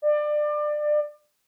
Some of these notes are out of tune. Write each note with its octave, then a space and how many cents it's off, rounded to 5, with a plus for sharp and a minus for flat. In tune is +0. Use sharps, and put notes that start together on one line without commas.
D5 +25